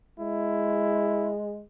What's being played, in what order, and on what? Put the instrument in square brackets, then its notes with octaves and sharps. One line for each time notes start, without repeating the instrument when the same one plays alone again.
[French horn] G#3 [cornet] E4